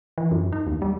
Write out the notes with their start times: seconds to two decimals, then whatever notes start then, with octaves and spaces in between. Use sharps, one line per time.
0.18 E3
0.31 F#2
0.53 D#4
0.67 D#2
0.82 G3